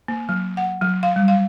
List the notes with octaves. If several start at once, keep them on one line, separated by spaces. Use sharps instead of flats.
A#3
F#3
F#5
F#3
F5
G3
F5